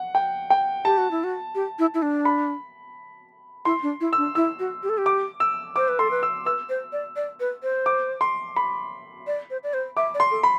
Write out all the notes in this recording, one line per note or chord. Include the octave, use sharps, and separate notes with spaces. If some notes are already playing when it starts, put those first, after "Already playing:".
Already playing: F#5
G5
G5
G4 A5
F#4
E4
F#4
G4
E4
E4
D4
B5
E4 C6
D4
E4
E6
D4
E4 E6
F#4
G4
A4
G4
D6
E6
C5 D6
B4
A4 C6
B4
E6
B4 E6
C5
D5
D5
B4
C5
D6
C6
B5
D5
C5
D5
C5
E5 D6
D5
C6
A4
B5